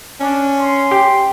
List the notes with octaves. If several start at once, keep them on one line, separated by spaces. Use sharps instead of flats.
C#4 D4
C6
G4